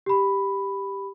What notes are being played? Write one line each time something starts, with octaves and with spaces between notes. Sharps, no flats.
G4 B5